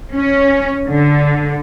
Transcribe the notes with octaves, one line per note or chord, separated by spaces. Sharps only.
C#4
D3